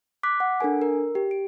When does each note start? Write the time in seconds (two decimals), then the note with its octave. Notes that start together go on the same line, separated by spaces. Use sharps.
0.23 D6 F#6 B6
0.40 F#5
0.60 D4 A4 A#4 G#5
0.82 A#4
1.15 G4
1.31 D7